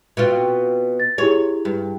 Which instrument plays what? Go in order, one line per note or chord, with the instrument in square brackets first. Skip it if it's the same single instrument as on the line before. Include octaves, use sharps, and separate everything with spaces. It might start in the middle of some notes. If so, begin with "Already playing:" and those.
[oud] B2 C4 F4
[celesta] A6
[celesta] E4 G4 G#4 [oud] C#5
[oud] G2